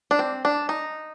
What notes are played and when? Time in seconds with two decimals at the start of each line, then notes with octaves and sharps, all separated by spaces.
0.11 D4
0.19 C4
0.45 D4
0.69 D#4